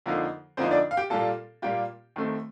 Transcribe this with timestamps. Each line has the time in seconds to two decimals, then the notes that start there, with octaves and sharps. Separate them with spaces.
0.06 F2 D3 F3 A#3 D#4
0.57 F2 D3 F3 A#3 C4 D#4 C5
0.71 D4 D5
0.91 F5
0.97 G4 G5
1.10 A#2 G3 A#3 F4 A4 A5
1.62 A#2 G3 A#3 F4 G4 G5
2.16 D#2 D#3 A3 C4